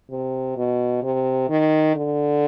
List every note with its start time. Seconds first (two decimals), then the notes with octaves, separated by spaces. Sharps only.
0.11 C3
0.57 B2
1.03 C3
1.49 D#3
1.95 D3